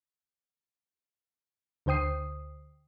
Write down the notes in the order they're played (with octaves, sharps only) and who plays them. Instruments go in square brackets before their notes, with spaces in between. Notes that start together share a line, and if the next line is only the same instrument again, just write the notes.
[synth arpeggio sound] D2 D3 C5 G5 D#6 C7